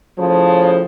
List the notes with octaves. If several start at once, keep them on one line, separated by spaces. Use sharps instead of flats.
A2 C#3 F3